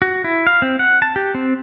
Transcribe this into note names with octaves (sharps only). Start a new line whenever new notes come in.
F#4
E4
F5
C4
F#5
A5
G4
C4